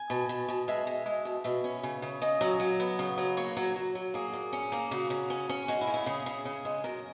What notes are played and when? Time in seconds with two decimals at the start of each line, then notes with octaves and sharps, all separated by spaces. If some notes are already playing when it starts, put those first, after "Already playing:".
Already playing: G#5
0.10 B2
0.29 B2
0.48 B2
0.68 G#3 E5
0.87 G#3
1.06 G#3
1.25 B2
1.44 B2 E5
1.64 C#4
1.83 C#3
2.02 C#3
2.22 C#3 D#5
2.41 F#3
2.60 F#3
2.80 B3
2.99 C#3
3.18 F#3
3.37 A#3 C#5
3.57 F#3
3.76 F#3
3.95 F#3
4.14 A#3 G#4
4.33 A#2
4.53 C#4
4.72 A#3
4.91 C#3 F#4
5.10 C#3
5.30 C#4
5.49 C#4
5.68 G#3 F#4
5.81 E4
5.87 C#3
5.94 E4
6.06 C#3 G#4
6.26 C#3
6.45 C#3
6.65 G#3
6.84 F#2 A#4